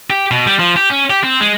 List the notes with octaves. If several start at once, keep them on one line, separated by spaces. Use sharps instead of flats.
G4
B2
G3
F3
G4
C#4
G4
C4
G#3